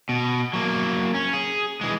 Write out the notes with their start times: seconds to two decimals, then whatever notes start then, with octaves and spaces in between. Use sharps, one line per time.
0.09 B2
0.53 F#3 A#3
1.14 C#4
1.33 G#4
1.81 E3 G#3